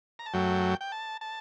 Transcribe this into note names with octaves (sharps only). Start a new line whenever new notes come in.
A#5
A5
F#2 F#3 A3 G5
G5
A5
A5